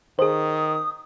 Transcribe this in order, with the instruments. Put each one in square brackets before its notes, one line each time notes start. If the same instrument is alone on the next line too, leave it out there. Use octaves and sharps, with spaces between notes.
[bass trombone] D#3 [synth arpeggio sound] G#4 C5 [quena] D#6